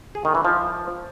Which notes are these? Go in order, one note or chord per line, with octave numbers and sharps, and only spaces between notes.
G#4
D#3
E3
F3